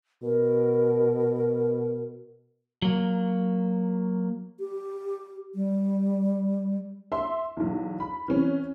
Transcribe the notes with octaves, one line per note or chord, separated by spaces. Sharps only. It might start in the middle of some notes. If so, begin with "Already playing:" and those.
B2 A#4
F#3 A#3
G4
G3
E5 C6
B1 E2
B5
E3 C4 C#4